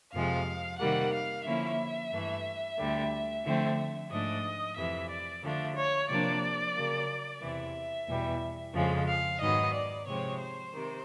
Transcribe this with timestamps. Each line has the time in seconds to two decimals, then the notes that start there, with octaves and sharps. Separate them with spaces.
0.12 F2 C3 F3 G#3 F5
0.78 C3 D#3 G3 A#3 F#5
1.12 F5
1.44 D3 F3 A#3 C#4 E4 E5
2.11 G2 E3 A3
2.77 D2 D3 G3
3.44 D3 F3 A3 C4
4.10 G#2 F3 A3 D4 D#5
4.76 F2 C3 E3 E5
5.09 D5
5.42 D3 F3 A3 D4
5.75 C#5
6.08 C3 F3 A#3 D4 D5
6.75 C#3 F#3 A#3
7.41 E2 C3 E3 E5
8.08 E2 B2 G3
8.74 F2 C#3 F3 G#3
9.07 F5
9.40 G#2 D#3 F#3 B3 D#5
9.73 D5
10.06 C3 F3 G#3 C4 C#5
10.39 C5
10.73 C3 D#3